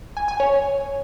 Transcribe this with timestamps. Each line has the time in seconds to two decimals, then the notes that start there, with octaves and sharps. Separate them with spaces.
0.17 G#5
0.28 G#5
0.40 C#5